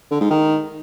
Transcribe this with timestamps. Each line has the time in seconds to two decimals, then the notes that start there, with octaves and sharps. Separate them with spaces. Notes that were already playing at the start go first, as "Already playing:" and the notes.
0.11 D3
0.21 G#2
0.30 D#3